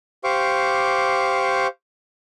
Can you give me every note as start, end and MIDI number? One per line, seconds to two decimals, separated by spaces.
0.24 1.67 67
0.24 1.67 72
0.24 1.67 77
0.24 1.67 85
0.24 1.67 86